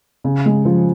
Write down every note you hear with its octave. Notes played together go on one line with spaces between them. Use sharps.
C#3
G#3
F3